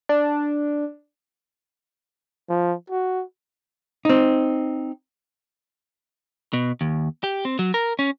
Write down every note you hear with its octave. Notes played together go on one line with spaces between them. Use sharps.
D4
F3
F#4
C4 D#4
B2
D#2
G4
C4
F#3
A#4
C#4